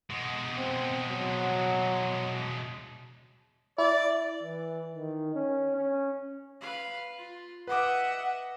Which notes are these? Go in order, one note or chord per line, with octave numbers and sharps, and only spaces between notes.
B2 G#3
C4
F#3
E4 D5
E3
D#3
C#4
C#4
B4 F5
F4
B4 D#5 E5 F#5 D6